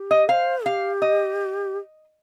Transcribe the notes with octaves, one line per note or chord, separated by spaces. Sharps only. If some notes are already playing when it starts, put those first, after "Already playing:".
Already playing: G4
D#5
C5 F5
G4 F5
D#5